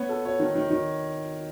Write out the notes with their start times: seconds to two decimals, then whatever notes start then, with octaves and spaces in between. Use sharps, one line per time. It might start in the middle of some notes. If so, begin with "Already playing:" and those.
Already playing: B3 C#5
0.09 A4
0.25 C#5
0.39 D#3
0.55 D#3
0.70 D#3